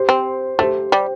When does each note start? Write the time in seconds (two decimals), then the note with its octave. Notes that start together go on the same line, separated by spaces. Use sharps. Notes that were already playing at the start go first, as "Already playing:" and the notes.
Already playing: G4 C5
0.09 C4
0.59 A3 G4 C5
0.92 G3